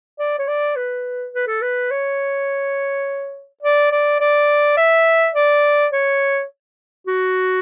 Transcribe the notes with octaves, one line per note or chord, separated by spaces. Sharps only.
D5
C#5
D5
B4
B4
A4
B4
C#5
D5
D5
D5
E5
D5
C#5
F#4